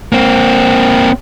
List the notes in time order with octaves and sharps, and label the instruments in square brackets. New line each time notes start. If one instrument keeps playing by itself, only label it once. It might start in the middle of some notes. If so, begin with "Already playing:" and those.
[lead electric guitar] A#3 C4